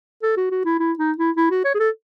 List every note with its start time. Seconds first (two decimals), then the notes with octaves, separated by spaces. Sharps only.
0.23 A4
0.37 F#4
0.51 F#4
0.65 E4
0.79 E4
0.99 D#4
1.17 E4
1.36 E4
1.51 F#4
1.64 C#5
1.74 G#4
1.79 A4